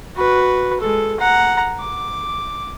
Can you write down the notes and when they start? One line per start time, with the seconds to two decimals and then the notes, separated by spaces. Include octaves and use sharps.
0.16 F#4 B4
0.80 G#3 A4
1.19 F#5 A#5
1.79 D6